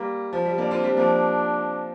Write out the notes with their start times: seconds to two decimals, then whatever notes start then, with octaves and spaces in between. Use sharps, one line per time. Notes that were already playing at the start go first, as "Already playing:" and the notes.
Already playing: G3 A#3
0.33 F3
0.45 G3
0.58 A#3 D4
0.71 C4 F4
0.83 G3 C4 D4
0.97 F3 A#3